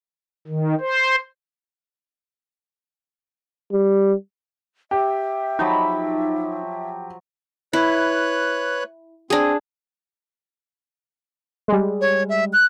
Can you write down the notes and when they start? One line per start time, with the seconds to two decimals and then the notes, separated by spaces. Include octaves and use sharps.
0.48 D#3
0.80 C5
3.72 G3
4.91 G4 E5
5.59 F3 F#3 D#4 B5
7.73 E4 B4 C#5 F#6
9.30 C4 D4 G#4
11.68 G3 G#3
12.01 C#5
12.29 E5
12.53 F#6